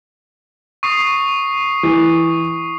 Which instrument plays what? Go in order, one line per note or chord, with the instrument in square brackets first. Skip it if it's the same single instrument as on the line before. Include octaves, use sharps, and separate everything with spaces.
[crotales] C#6 D#6 C7
[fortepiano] E3